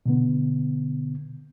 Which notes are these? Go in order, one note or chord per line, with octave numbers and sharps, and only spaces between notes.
B2 D3 B3